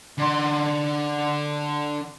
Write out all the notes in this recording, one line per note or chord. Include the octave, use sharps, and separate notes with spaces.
D3 C6